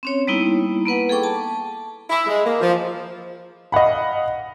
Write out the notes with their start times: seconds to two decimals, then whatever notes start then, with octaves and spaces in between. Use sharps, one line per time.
0.03 C4 C#4 C#5
0.27 G3 A#3 B3 D#4 E4
0.85 A#3 B3 B4 F#5
1.09 G#4 A4 G5 C#6 D6
1.23 A5
2.10 E4
2.27 G#3
2.46 A#3
2.61 F3
3.72 D#5 F5 F#5 B5